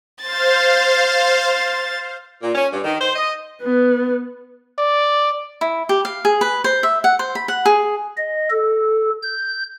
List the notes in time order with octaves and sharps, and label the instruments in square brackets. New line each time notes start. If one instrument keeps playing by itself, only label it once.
[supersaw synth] C5 F5 [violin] A6
[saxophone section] A#2
C#4
G2
D#3
C5
D#5
[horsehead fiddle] B3
[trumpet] D5
[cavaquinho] E4
G4
F5
G#4
B4
C5
E5
F#5
C5
B5
F#5
G#4
[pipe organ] D#5
A4
G6